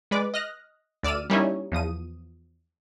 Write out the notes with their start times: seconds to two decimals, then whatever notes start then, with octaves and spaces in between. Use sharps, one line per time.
0.11 G#3 B4 D5 D6
0.34 D#5 F6 F#6 A#6
1.03 D2 D5 E6 F6 D#7
1.30 G3 A#3 C#4 D#4 E4 C#5
1.72 E2 F3 D#6 D#7